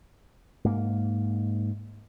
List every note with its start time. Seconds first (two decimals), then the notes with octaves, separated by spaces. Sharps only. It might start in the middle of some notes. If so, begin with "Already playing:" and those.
0.64 G#2 A#3